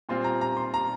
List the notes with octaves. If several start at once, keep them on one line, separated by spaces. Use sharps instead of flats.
A#2 G3 C4 F4 C6
A#5
A#5
C6
A#5